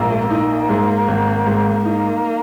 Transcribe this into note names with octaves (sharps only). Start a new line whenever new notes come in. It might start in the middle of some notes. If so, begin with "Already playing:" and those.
Already playing: A#1 G#2 A#3
A#3 D#4
G#2
G#1
G#2
A#3 D#4